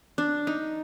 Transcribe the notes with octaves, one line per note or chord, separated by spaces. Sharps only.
D4
D#4